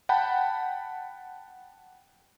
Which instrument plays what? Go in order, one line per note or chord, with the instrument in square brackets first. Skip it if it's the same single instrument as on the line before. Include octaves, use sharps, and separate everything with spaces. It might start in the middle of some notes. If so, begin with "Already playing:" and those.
[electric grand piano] F#5 G5 A5 B5